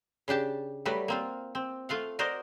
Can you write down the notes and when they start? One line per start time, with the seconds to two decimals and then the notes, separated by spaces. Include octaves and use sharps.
0.28 C#3 D4 G4 A5
0.85 F#3 G3 A3 B4 D5
1.08 A#3 C4 F4
1.55 C4
1.89 A3 F4 F5 F#5
2.19 F#4 A#4 C5 D5 D#5